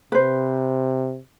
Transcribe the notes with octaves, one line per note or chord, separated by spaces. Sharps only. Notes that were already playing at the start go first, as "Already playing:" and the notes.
C3 B4 C5